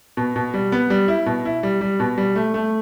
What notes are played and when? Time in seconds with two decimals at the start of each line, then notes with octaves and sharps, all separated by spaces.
0.17 B2
0.36 B2
0.54 G3
0.72 B3
0.90 G3
1.08 E4
1.26 B2
1.45 E4
1.63 G3
1.81 G3
2.00 B2
2.18 G3
2.36 A3
2.54 A3